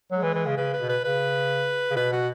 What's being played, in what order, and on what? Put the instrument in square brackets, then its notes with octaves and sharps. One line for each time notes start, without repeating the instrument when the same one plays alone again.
[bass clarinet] F#3 [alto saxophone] G#3
[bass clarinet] E3
E3
C#3
[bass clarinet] C#3 [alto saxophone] B4
[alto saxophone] B4
[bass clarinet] B2
[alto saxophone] B4
[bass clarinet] C#3 [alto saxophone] B4
[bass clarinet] C#3
[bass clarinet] B2 [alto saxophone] B4
[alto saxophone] F#4